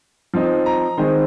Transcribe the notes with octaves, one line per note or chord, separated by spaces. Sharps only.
F3 C4 D#4
A#5
D#3 G#3 C4 D#4 C5